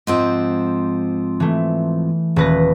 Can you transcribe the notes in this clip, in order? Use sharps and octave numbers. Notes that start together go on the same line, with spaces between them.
G#2 F3 C4
E3 A3
D#1 B4 A#6